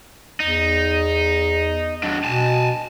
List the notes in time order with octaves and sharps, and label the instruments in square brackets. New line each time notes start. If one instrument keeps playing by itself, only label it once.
[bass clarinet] E2 [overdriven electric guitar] D#4
[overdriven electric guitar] F#3 D4
[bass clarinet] B2 [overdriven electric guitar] G#5 A5